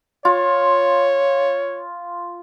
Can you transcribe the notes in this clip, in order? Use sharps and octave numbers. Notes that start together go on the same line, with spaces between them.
F4 C#5